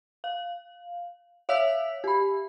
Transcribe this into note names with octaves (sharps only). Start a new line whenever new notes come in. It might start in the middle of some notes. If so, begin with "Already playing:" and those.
F5
C#5 E5 F5 E6 B6
G4 B5